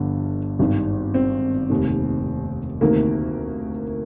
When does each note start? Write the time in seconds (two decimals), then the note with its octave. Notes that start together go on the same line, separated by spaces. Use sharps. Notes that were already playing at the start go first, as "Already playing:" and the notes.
Already playing: G1 G2 D3 F3
0.59 G#1 G2 D#3
1.14 C4
1.70 F1 D#2 D#3
2.81 D2 C3 D#3 A#3